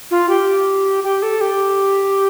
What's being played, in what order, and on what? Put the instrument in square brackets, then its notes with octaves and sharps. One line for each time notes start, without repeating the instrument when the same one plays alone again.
[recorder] F4
G4
G4
A4
G4